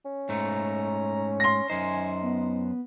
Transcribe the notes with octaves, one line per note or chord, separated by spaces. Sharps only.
C#4
G#2 A3 A#5
C6 A#6
F#2 D#4 C5 G#5
B3